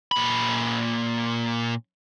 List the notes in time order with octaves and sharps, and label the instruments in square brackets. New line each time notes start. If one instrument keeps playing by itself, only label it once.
[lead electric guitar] A#2 B5